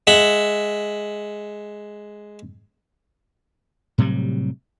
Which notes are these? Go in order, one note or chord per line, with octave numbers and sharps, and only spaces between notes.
G#3 E5 F#5
A2 C3 F#3 G3